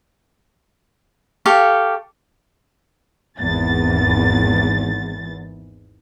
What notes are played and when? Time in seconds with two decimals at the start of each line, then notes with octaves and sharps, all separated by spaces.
1.46 G4 A4 F5 C#6
3.39 G#1 E2 A6